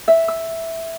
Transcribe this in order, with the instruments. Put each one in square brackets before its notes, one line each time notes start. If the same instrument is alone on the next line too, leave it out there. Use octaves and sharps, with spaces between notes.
[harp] E5
E6